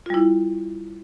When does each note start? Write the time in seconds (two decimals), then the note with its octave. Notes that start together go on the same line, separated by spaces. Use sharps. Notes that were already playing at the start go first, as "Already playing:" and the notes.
0.06 F4
0.10 G3
0.14 E4